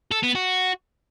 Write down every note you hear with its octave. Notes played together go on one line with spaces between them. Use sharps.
A4
B3
F#4